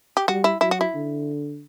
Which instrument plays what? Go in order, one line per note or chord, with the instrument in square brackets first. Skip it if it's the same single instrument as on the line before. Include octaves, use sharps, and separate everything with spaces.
[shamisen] G4
[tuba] G3 [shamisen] F#4
[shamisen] E4
[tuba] F#3 [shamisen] E4
[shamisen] F#4
E4
[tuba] D3